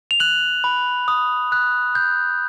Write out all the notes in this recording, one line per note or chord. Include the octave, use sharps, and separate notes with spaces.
F7
F#6 F#7
B5
D#6
F#6
G6